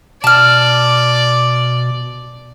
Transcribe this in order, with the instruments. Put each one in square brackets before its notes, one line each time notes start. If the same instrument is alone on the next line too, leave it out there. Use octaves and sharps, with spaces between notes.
[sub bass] B2 [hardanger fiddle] D5 [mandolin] A5 F6